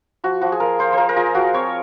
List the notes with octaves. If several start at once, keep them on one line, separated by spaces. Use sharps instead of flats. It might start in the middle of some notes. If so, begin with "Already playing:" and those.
F3 F#4
F3 F#4
G#4
F4 A#4
F4 C5
F4 A#4 C5
A#4
F4 G#4
F3 F#4
C4 C#5